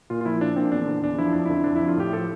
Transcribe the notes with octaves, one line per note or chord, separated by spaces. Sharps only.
A#2 F4
F4
F3 E4
F3 D4
A#2 C4
E2 D4
D3
E2 D4
F3 E4
F2 D4
D3 E4
F2 D4
E4
F3
F4
A2 G4
F3 A4